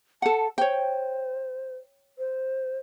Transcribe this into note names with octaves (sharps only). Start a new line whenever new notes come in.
A4 F#5 A5
C5 C#5 G5
C5